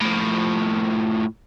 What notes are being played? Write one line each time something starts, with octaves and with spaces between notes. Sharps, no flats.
A2 F3